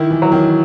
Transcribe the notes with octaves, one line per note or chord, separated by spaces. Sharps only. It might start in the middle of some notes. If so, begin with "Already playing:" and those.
Already playing: D#3 E4
E3
F#3
D#3